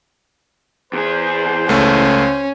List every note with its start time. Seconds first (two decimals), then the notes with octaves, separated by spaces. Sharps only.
0.93 E2 G#4 C5
1.69 C#2 A3 C#4